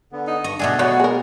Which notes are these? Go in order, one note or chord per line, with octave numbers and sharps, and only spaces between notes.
D3 B3
D#4
G2 D#5 C#6
B2 A3 D4 G#4 D5 D#5 F#5
F#3 B3 F#4
G#3 G#4 A#4